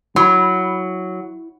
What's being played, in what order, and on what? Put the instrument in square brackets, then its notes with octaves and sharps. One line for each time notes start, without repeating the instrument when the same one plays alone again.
[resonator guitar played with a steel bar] F#3 [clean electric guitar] E4 B5